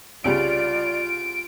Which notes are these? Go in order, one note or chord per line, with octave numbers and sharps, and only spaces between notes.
C2 C#3 G3 F4 D5 D7